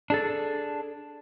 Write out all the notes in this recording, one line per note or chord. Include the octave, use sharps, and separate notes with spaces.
D4 G#4 A4